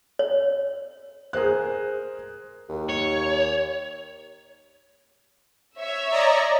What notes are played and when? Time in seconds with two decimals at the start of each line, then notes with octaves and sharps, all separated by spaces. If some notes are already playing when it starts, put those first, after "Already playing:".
0.19 C#5
1.33 G#4 A#4 C5 F#6
2.69 D#2
2.89 C#5
5.79 C#5 E5
6.11 D5 D#5 A#5